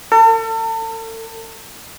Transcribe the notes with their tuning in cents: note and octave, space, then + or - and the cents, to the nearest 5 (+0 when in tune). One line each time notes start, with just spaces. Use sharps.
A4 +40